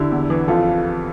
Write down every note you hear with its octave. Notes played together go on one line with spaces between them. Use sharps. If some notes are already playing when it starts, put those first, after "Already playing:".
Already playing: D3 E4 G4
E2
E3
F2 F4 A4